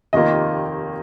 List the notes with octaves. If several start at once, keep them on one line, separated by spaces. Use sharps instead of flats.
F1 D#2 D#3 A#3 F4 D#5